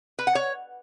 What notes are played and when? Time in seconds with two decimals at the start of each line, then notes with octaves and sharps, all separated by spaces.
0.19 B4
0.27 F#5
0.35 C#5